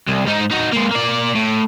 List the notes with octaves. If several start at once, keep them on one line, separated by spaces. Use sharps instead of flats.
C2
G#2 D#4
D#4 F#4
G#3 A#3
A#3 D5
A2